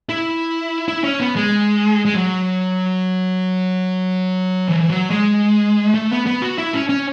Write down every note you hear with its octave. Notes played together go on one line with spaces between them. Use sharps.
E4
E4
C#4
B3
G#3
G#3
F#3
E3
F#3
G#3
A3
B3
B3
F#4
E4
C#4
C#4